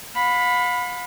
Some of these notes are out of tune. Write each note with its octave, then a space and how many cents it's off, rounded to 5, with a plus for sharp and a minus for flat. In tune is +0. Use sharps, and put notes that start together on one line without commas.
F5 +45 B5 +5